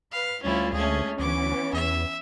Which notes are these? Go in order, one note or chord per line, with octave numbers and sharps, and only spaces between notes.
B4 F5
D2 G3 C#4 E4 F4
D2 G#3 A3 C#4 G#4
D2 E3 B3 C#4 D6
E2 E5